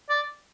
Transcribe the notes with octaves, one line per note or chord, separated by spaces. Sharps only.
D5